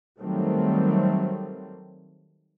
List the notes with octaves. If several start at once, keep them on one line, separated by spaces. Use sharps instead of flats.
D#3 F#3 G3 A3 C4